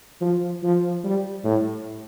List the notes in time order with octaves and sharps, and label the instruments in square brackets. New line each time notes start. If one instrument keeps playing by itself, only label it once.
[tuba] F3
F3
G3
A2